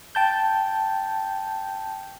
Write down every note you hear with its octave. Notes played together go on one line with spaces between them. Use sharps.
G5 A5 G6